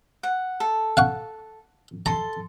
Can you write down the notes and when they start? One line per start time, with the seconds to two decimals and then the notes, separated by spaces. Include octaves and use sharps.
0.23 F#5
0.60 A4
0.97 F5 F#5 C#6
2.06 A4 A#5 C6